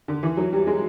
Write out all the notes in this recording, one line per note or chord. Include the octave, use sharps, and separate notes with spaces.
D3
E3
F#3
G3
G#3